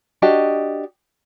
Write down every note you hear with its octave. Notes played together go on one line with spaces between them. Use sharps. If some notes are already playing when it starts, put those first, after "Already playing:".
D4 F#4 G4 D#5